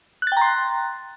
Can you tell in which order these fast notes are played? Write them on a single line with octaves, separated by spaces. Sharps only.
F#6 A6 G5 A#5 C6